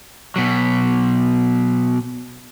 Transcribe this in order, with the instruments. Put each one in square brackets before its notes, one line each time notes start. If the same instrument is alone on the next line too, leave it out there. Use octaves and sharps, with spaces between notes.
[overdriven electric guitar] B2 F#3